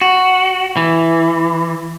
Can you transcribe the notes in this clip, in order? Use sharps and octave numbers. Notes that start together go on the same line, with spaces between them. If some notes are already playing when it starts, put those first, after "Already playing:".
F#4
E3